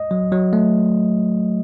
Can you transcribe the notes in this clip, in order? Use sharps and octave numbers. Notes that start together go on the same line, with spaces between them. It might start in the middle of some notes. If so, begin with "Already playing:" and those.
Already playing: D#5
F#3
F#3
A3